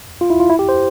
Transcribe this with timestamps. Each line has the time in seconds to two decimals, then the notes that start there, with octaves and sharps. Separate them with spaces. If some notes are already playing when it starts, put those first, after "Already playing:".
0.21 F4
0.30 E4
0.40 F4
0.50 E4
0.59 G4
0.69 C5